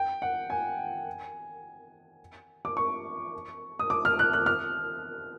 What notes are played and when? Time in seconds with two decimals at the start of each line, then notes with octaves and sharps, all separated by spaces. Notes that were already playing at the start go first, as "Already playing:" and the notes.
Already playing: G5
0.22 F#5
0.50 G#5
2.65 D6
2.77 C#6
3.79 D#6
3.90 D6
4.05 F6
4.19 F#6
4.33 F#6
4.46 F6